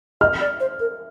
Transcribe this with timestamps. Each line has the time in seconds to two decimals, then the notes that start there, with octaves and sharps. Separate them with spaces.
0.21 D#5 F6
0.41 D5
0.60 C5
0.80 A#4